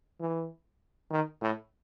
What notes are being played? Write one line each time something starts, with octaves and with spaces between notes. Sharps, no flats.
E3
D#3
A2